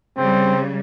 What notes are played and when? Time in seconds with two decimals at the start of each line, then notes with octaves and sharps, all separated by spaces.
0.17 C#3 G3 C4